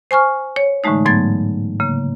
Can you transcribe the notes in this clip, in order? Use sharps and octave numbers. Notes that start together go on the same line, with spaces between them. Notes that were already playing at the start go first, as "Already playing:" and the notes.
C5 G#5 C#6 F6
C#5
A2 D3 E3 G#3 A3 D#4
G#2 F#3 A3 B3 G#6 A6
C#3 A#3